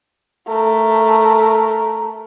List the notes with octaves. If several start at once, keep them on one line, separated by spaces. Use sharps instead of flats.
A3 A#4